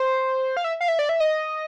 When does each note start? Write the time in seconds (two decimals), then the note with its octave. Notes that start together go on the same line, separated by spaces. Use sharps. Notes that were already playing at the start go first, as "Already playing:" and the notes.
Already playing: C5
0.57 F5
0.64 E5
0.81 F5
0.88 E5
0.99 D5
1.09 E5
1.20 D#5